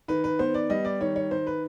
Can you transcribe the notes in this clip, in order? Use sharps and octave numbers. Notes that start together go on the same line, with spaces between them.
D#3 B4
B4
B3 C5
D5
G3 D#5
D5
D#3 C#5
C#5
D#3 C5
B4